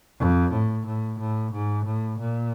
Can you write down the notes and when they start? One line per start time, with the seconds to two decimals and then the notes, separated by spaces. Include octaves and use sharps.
0.19 F2
0.52 A2
0.86 A2
1.19 A2
1.53 G#2
1.86 A2
2.20 A#2